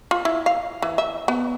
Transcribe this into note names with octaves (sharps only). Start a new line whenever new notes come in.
F4
E4
F5
E3
E5
B3